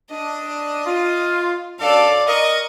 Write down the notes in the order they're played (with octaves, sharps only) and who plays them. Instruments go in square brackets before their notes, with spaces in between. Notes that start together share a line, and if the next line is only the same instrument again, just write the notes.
[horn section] D4 [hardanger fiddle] D#5
[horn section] F4
[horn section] F#2 D4 A4 [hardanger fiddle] D5 F5
[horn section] A#4 D#5 [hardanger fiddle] C#6